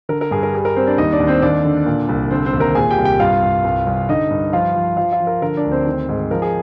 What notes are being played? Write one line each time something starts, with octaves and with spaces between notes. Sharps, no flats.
D3 A#4
A#4
G2 G#4
A#4
G3 G#4
A#4
G3 C4 C5
D4 D5
D#2 D#4 D#5
D4 D5
D#2
C4 C5
D#2 D4 D5
D3
A#2
C2
D3 C4 C5
C4 C5
D#2
A#4 A#5
A#2 G#4 G#5
G4 G5
C2
G4 G5
G2 F4 F5
G2
C2
C2
D3 D#4 D#5
G2
F3 F4 F5
F3
F3 F4 F5
F4 F5
F3
A#4
D3 A#4
D4 D5
D2
C4 C5
D#3
G#2
F3 A#4
G#4